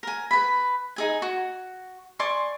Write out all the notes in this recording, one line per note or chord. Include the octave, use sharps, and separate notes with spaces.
A#4 G#5
B4 B5
D#4 G#4 G#5
F#4
D5 G#5 C6 C#6